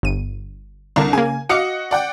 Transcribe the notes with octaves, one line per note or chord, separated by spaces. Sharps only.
G1 D#7
C2 D3 D4 A#4
C#3 A#3 G#5
F#4 D#5 F5 D6 C#7
D5 F#5 G5